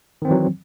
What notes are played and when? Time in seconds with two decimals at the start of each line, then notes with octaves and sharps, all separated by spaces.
0.22 D#3
0.25 C4
0.28 E3
0.31 F#3